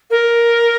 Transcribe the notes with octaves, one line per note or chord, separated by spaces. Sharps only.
A#4